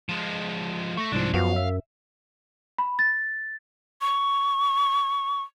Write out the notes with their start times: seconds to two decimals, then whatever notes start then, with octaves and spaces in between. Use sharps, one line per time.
0.09 F3 G#3
0.97 A3 C#6 A#6
1.12 C2 G#2 F3 C4 D4
1.34 F#2 F3 B3 F#4 F5
1.56 E5
2.79 B5
2.99 A6
4.01 C#6